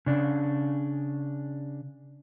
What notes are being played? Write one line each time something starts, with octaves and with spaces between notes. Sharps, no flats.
C#3 D4